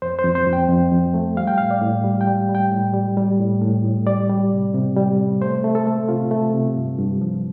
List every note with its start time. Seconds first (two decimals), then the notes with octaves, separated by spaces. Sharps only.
0.02 F2 C5
0.19 C5
0.24 F2
0.35 C5
0.46 F2
0.53 G5
0.69 F2
0.92 F2
1.14 A3
1.37 G3 F5
1.47 G5
1.58 A2 F5
1.71 D5
1.81 A2
2.04 G3
2.21 G5
2.27 G3
2.49 G3
2.55 G5
2.72 A2
2.94 G3
3.17 G3
3.39 A2
3.61 A2
3.84 A2
4.07 G3 D5
4.29 G3
4.51 C3
4.74 C3
4.97 G3
5.19 C3
5.41 A3 C5
5.64 A3
5.75 A4
5.87 A3
6.09 C3 F4
6.31 A3
6.54 C3
6.76 G2
6.99 G2
7.21 F3